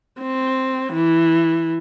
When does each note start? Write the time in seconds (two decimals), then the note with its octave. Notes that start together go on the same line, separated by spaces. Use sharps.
0.21 C4
0.93 E3